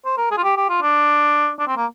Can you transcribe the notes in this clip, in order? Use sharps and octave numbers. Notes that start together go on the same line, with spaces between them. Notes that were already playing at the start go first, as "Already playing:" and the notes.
C5
A#4
G#4
F4
G4
G4
F4
D4
D4
C4
A#3